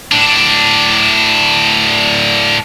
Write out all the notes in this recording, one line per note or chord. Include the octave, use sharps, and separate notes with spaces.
A2 D4